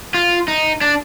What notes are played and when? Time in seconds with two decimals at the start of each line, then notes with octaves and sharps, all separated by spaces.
0.14 F4
0.48 D#4
0.81 D4